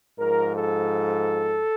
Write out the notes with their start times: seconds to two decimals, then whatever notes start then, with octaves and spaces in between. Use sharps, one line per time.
0.18 G#2 F3 A#4
0.55 A4